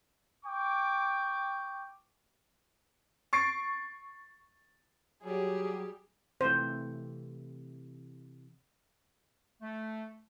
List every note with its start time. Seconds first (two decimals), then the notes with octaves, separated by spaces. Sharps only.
0.45 G5 C#6 D6
3.33 C#6 A6 C7 D7
5.24 F#3 G3 G4 G#4
6.41 C3 E3 A3 C5
9.62 A3